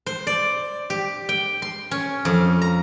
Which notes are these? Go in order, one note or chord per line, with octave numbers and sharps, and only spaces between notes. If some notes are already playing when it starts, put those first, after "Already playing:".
C5
D5
G4
G5
C6
C#4
F2
A#5